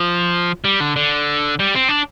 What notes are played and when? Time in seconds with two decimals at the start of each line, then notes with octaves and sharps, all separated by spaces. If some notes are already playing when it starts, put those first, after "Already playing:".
Already playing: F3
0.64 G3
0.80 D3
0.96 D3
1.59 G3
1.75 C4
1.89 D4